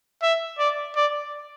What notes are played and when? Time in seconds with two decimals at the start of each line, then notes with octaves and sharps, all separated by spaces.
0.23 E5
0.59 D5
0.95 D5